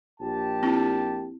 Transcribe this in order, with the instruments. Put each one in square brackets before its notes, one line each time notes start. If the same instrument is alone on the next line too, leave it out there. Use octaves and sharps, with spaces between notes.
[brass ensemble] A#1 G4 A5
[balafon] C4 E4